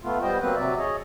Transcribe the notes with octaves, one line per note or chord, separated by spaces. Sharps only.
A3 B3 F4
G3 B3 C5 D#5 G5
F#3 A#3 C4 B4
C3 F#3 D5 E5
G#4 C#5 D#5